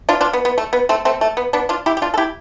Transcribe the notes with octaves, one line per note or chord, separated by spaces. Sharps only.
D4 F4
D4 F4
B3
B3
A3
B3
A3 C4
A3 C4
A3
B3
B3 D4
D4 F4
E4 G4
G4
D4 F4
A4
E4 G4